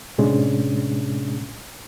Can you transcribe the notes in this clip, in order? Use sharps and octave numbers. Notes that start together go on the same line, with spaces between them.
A2 C3 G#3 C#4 D4